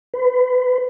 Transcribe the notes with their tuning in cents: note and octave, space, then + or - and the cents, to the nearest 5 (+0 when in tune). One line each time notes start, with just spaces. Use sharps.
B4 +30